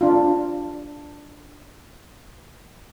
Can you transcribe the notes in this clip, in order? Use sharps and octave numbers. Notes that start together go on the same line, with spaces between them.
D4 F4